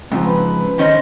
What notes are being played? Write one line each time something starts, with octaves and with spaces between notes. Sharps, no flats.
G#2 C#3 F3 C4
B4
D#3 C#4 C5 D#5